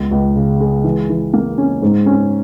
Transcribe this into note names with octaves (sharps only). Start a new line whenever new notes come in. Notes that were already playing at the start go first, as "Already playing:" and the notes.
Already playing: C#2 B3
C#2
C#3
G#3
E3
E3
A#3
C#4
G#2
C#4